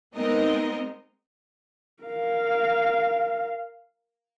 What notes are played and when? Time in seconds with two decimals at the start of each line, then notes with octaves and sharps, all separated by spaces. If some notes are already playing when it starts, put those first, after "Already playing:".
0.16 G#3 B3 C4 D#4 A#4 D#5
2.03 A#4 F5